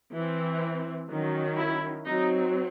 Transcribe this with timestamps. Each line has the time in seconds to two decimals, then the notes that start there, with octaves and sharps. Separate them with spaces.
0.13 E3 C4
1.09 D#3 F#3 C#4
1.58 E4
2.06 F#3 C4 D#4